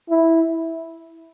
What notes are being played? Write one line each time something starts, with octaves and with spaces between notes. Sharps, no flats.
E4